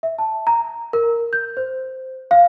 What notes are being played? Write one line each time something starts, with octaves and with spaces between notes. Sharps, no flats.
E5
A5
A#5
A#4
G6
C5
F5